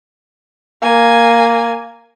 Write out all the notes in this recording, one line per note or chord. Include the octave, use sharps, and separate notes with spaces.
A#3 G#5